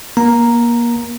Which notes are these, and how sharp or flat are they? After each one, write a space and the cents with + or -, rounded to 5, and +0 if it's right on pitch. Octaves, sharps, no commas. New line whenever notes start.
A#3 +25 A#5 +0